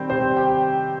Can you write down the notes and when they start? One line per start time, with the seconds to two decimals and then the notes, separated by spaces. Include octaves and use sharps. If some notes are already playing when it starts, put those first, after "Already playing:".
Already playing: D#3 G3 C4 G5 B5 G6
0.10 C3 C5 C6
0.37 G4 G5